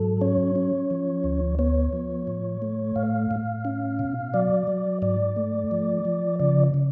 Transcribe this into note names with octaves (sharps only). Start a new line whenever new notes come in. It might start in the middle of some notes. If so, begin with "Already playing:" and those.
Already playing: G#2 F#3 A4
C#4 C#5
C#4
F3
D2
B3 C#5
F3
A2
A3
A2 F5
A2
C#4
B2
F#3 D5
F#3
G#2 D5
A3
F3
F3
C#3 D5
C#3